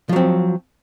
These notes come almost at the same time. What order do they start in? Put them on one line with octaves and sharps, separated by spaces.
F3 F#3 C4